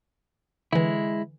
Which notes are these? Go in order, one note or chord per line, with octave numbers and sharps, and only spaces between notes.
D3 E3 G#3 E4